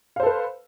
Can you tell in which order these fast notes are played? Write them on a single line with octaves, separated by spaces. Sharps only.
F5 C5 A4 B4